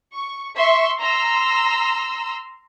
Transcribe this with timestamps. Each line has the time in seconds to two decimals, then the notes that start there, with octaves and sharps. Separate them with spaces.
0.13 C#6
0.55 E5 C6 C#6
1.00 A#5 C6 E6